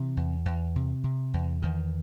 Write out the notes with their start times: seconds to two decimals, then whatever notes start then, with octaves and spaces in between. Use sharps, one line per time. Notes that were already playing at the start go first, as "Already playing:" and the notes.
Already playing: C3 E3
0.17 E2
0.45 E2
0.76 C3
1.04 C3
1.34 E2
1.62 E2 D#3